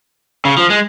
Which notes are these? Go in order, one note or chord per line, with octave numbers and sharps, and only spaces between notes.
C#3
F3
G#3